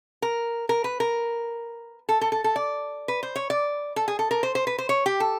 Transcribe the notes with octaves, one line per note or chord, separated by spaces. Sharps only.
A#4
A#4
B4
A#4
A4
A4
A4
A4
D5
B4
C5
C#5
D5
A4
G#4
A4
A#4
C5
C5
B4
C5
C#5
G4
A4